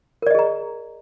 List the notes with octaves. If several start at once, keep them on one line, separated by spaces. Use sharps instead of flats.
G#4 A#4 D5 D#5 A#5